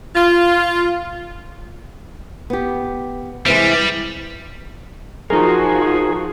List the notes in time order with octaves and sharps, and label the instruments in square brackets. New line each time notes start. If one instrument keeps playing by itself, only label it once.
[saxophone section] F4
[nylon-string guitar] B3 G4
[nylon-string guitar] C3 E3 G#3 [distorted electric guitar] G3
[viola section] F3 F#4 [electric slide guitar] D#4 A#4 [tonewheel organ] G#4